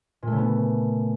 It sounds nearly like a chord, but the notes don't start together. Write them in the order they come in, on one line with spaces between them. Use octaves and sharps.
A#2 A3 C#3 B3